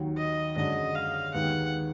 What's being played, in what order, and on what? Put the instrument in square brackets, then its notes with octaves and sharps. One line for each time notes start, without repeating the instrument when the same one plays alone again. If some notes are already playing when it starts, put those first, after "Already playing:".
Already playing: [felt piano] D#2 D#3 F#3
[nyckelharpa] D#5
[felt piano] F#2 D3 G#3 D4 [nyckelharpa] D#5
[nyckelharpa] F5
[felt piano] D#2 D#3 G#3 B3 [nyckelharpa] F#5